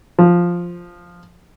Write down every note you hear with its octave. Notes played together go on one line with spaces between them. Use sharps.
F3